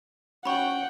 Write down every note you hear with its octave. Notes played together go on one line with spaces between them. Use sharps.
C#4 F#4 C#5 F#5 G5 B5 C#6